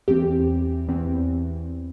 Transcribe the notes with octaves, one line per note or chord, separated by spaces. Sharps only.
E2 E3 C4 G4
E2 E3 C4